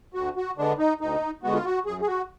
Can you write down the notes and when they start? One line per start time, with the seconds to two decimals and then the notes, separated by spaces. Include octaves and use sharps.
0.14 D2 F#4
0.36 F#4
0.58 D3 G#3 B3 D4
0.79 D#4
1.01 D2 D#4
1.43 D3 G#3 B3 F#4
1.54 F4
1.65 F#4
1.86 F#2 G#4
2.01 G#4
2.07 F#4